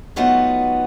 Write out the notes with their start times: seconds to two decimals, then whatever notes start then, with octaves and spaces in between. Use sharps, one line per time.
0.16 F#3 A3 B3 D#4 F4 F#4